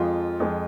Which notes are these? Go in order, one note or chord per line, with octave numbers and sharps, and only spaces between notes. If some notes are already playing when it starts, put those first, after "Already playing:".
Already playing: F2 F3 G#3 F4
F2 F3 G#3